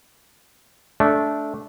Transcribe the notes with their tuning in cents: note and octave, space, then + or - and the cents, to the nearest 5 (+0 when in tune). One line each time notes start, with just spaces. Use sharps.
A3 -15 D4 -15